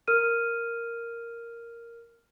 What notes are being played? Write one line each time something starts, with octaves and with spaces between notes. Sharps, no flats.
A#4 F6 D#7